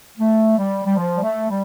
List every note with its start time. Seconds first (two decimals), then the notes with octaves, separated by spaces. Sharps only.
0.18 A3
0.57 G3
0.84 G3
0.96 F3
1.18 G3
1.22 A3
1.49 G3